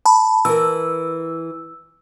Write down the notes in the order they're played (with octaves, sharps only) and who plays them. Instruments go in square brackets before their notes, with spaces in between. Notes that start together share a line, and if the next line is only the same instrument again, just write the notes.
[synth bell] A5 B5
[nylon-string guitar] E3 A#4 [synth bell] E6